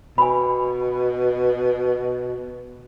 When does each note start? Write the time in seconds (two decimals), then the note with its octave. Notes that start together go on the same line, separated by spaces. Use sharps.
0.18 B2 G#5 B5